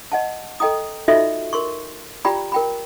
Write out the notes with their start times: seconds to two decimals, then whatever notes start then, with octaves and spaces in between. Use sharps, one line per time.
0.12 D#5 F#5 A5
0.60 A4 D#5 G5 A#5 D#6
1.08 D#4 F4 F#4 A4 D#5 E5
1.53 A#4 C6 C#6
2.25 F4 G4 D5 G5 A#5 B5
2.52 A#4 G5 B5